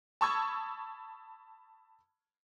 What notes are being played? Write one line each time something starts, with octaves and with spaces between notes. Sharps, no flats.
A5 B5 C#6 D#6 E6 G#6